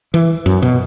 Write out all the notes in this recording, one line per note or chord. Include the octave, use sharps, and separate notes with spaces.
E3
F#2
B2